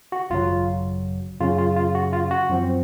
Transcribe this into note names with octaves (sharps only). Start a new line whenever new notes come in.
F#4
G#1 F#2 C#3 F#3 F4
F#2 C#3 F#3 C#4 F4
F4
F4
F#4
F4
F#4
F#2 F3 C4